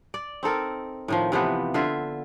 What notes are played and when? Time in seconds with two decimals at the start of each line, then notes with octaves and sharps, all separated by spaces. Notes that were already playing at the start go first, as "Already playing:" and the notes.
0.14 D5
0.43 C4 D#4 A4 A#4
1.08 A2 D#3 F3
1.32 C3 E3 F3 B3
1.74 D3 F4 E5